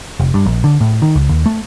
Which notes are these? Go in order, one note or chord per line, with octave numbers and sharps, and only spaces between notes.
F1
G2
A#1
D3
A2
D#3
C#2
D#2
A3